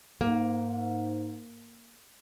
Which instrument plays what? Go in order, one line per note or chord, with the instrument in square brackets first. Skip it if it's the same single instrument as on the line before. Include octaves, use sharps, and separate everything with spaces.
[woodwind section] G#2 [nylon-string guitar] A#3